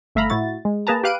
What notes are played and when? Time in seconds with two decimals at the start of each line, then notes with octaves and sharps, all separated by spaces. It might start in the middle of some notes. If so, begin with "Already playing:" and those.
0.15 G1 A3 E5 F5 A#5 B5
0.30 A2 E4 F#4 A6
0.65 G#3
0.87 A#3 G#4 B4 A5 A#5
1.04 G4 B4 F5 F#6 D7 D#7